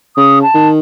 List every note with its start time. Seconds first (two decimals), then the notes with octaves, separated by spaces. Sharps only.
0.17 C#3 D#6
0.42 A5
0.54 D#3